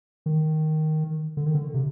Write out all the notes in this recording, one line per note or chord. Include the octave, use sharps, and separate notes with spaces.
D#3
D3
D#3
D3
C3